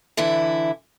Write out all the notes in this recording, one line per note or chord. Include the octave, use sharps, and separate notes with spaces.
D3 E3 E4